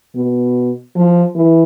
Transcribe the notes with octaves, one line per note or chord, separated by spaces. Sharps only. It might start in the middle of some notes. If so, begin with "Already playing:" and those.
B2
F3
E3